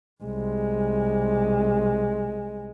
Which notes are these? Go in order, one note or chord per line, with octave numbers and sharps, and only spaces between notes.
C2 G#3